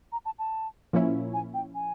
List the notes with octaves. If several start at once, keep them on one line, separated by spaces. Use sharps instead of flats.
A#5
A5
A5
A#2 F3 A#3 C#4 E4
G#5
G5
G#5